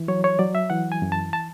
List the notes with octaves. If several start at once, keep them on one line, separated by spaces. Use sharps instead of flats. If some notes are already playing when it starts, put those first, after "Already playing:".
Already playing: E3
F#3 C#5
C#5
F#3 D5
E5
E3 F#5
G#5
F#2
A5
A5